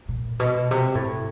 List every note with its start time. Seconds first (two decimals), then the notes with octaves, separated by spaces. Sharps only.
0.08 A#2
0.39 B2
0.71 C3
0.95 A2